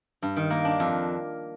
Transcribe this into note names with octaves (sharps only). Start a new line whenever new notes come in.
G2
D#3
A#3
D4
F2